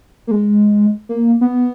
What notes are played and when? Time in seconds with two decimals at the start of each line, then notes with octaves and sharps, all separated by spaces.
0.27 A#3
0.31 G#3
1.09 A#3
1.41 B3